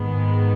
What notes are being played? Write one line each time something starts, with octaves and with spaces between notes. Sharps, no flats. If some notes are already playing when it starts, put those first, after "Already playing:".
Already playing: G#2 D#3 G#3 B3